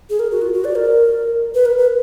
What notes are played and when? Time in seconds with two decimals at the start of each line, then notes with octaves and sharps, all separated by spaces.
0.10 G#4
0.19 A#4
0.31 F#4
0.42 F4
0.53 F#4
0.65 D5
0.75 A#4
1.55 B4
1.65 A#4
1.78 B4